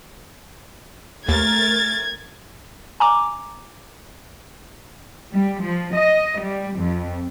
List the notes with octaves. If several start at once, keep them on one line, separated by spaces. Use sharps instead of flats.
D#2 A3 A#4 G#6 A6
G#5 A#5 D6
G3
F3
D#5
G3
F2